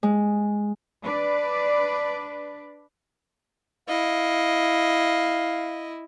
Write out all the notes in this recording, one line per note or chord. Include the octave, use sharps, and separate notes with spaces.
G#3
D4 B4 D5
E4 D#5 F5